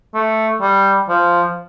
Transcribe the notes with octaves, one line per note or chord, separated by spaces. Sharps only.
A3
G3
F3